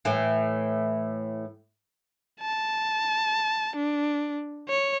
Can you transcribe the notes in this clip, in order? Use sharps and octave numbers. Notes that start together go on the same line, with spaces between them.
A2 E3
A5
D4
C#5